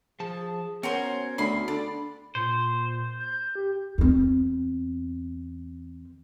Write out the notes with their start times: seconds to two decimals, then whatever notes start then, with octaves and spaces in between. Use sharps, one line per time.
0.20 F3 G#4 A5
0.83 B3 C#4 F#4 A#4 C5 C#5
1.38 D2 B5 C6
1.68 D3 D5 B5
2.35 A#2 C5
3.20 G6
3.55 G4
3.98 E2 C4